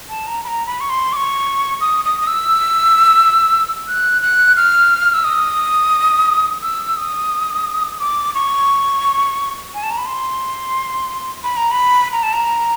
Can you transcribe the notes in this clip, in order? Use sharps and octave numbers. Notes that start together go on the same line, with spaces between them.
A5
A#5
B5
A#5
B5
C#6
C6
D6
C#6
D#6
D#6
D#6
E6
F#6
F#6
F6
E6
D#6
E6
D#6
D6
C#6
G#5
A5
A#5
B5
C6
B5
A#5
B5
A#5
A5
A#5